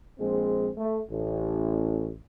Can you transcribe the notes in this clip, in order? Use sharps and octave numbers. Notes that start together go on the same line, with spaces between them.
A#1 G#3 C4 G#4
A3
A1